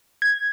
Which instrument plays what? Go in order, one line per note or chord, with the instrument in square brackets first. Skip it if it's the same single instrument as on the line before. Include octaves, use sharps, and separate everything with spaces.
[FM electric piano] G#6